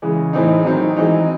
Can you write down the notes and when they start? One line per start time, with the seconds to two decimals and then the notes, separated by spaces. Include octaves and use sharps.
0.02 C#3 E3 G#3
0.33 A2 E3 C4 D#4
0.65 D#3 F#3 C4 D#4
0.97 E3 G#3 C4 D#4